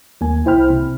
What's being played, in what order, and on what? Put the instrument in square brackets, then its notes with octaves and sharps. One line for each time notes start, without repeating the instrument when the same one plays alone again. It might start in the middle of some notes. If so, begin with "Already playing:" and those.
[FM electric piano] D#2 A#3 G#5
C2 E4 C5 G5 B5 F6
C3